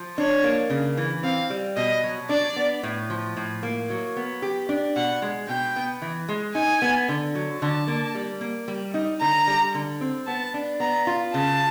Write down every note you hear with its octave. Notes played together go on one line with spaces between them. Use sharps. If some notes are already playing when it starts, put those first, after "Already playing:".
Already playing: F3
D4 C#5
A#3
C#3
E3
C4 F5
G3
B2 D#5
F#3
D4 D5
B3
A2
F3
A2
A#3
F#3
B3
G4
D4
B2 F#5
G#3
B2 G5
B3
E3
G#3
D#4 G#5
B3
D3
F#3
D3 A5
A#3
G3
A#3
G3
D#4
D3 A#5
G3
D3
C4
B3 A5
D4
B3 A#5
F4
C#3 A5